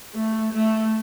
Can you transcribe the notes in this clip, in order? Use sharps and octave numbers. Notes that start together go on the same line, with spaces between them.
A3
A3